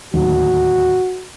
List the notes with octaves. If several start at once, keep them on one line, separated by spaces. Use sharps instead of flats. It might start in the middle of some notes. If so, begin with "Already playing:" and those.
D1 D#2 F#4